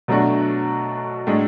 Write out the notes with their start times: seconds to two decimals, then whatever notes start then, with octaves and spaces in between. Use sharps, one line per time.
0.08 B2 F#3 A3 D4 F#4
1.27 A2 G#3 D4